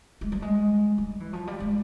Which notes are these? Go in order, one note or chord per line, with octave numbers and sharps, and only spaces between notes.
G#3
G3
G#3
G3
E3
F3
G3
G#3